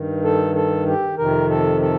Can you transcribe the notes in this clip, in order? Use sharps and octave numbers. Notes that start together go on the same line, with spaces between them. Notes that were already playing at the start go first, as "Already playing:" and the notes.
Already playing: G2 D#3
A4
A4
G4
F2 C3 D#3 A#4
A4
A4